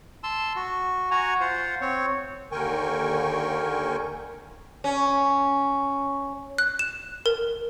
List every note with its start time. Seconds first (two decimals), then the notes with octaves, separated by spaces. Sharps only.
0.23 A5 C6 E6
0.56 F#4
1.11 F#4 F#5 G#5 A#5
1.41 F4 C5 F#5
1.81 C4 C#5
2.52 D#2 D3 A#4 G5 G#5 C#6
4.84 C#4
6.58 F#6
6.79 E7
7.26 A#4